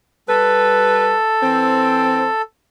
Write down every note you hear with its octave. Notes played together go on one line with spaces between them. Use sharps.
G3 A4 B4
E3 C4